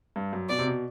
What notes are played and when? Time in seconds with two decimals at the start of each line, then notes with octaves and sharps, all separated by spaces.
0.16 G2
0.33 F#2
0.49 B2 D5
0.59 C3
0.67 B2